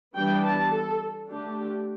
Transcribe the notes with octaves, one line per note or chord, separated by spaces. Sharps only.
E3 G3 B3 D4 G5
A5
A4
D3 A3 D4 G4